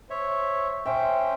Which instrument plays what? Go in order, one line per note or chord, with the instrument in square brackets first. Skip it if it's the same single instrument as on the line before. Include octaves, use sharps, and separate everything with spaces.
[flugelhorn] C5 [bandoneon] C#5 E5
[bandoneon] C#4 G5 [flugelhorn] C5 [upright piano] E5